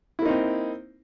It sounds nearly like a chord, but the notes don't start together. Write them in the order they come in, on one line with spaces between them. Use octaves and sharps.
E4 A#3 D#4 C4